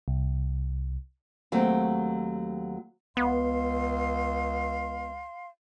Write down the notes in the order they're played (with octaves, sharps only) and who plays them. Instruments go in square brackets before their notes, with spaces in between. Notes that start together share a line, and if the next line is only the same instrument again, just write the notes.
[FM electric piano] C2
[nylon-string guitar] D#2 F#3 A3 C4
[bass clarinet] C#2 [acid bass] B3 [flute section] F5 C6